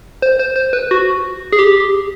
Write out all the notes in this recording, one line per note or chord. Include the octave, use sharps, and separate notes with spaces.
C5
C5
C5
B4
F#4
G#4
G4